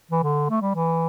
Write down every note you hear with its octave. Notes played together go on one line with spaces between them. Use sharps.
E3
D3
A3
G3
E3